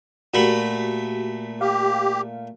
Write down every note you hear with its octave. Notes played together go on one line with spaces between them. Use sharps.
A#2 A3 F#4 G4 B5
G4 F5